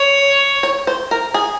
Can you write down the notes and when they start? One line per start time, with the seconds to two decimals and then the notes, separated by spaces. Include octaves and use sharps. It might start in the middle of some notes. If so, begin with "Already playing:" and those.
Already playing: C#5
0.63 C#5
0.87 C5
1.11 A#4
1.34 G#4